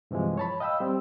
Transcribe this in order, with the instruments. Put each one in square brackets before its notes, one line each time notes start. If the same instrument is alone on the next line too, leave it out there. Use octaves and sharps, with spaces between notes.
[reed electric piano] G2 C3 E3 F3 G#3
C#5 A5 B5
D#5 F5 G5 B5 E6
G3 C4